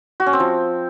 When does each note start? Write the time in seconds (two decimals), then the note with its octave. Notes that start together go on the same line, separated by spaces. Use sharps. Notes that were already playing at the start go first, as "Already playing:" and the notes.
0.20 F#4
0.26 C#4
0.33 C4
0.40 F3